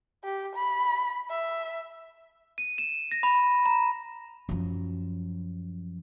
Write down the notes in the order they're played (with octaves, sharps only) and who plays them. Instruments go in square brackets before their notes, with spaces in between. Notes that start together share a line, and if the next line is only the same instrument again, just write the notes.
[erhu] G4
B5
E5
[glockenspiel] D#7
E7
A#6
B5
A#5
[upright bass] F#2 F3